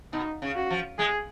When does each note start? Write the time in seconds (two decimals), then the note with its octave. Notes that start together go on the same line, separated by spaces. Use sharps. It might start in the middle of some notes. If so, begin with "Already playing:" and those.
0.13 B2 D#4
0.42 C#3
0.56 F#4
0.70 F3
0.99 G#3 G#4